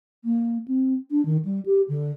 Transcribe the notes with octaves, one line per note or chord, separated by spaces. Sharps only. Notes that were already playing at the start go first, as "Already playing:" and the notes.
A#3
C4
D4
D#3
G3
G4
D3